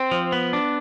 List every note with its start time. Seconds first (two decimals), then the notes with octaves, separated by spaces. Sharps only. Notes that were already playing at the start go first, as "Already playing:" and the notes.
Already playing: C4
0.11 F3
0.32 B3
0.53 D4